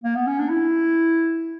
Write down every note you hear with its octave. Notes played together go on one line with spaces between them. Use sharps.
A#3
B3
C#4
D4
E4